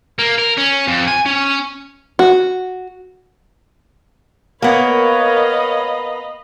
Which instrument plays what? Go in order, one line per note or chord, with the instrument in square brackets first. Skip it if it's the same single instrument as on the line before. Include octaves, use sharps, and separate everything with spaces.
[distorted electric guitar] A#3
A#4
C#4
F2
G#5
C#4
[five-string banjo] F#4
[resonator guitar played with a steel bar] A#3 B3 [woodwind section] A#4 C#5 [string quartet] D#5 F5 B5